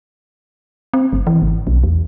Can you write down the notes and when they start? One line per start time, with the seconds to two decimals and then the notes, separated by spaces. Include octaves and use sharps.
0.94 C4
1.13 G1
1.27 E3
1.42 G#1
1.67 B1
1.83 E2